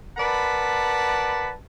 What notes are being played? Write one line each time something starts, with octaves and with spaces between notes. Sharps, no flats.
A#4 B4 D5 F#5 A5 B5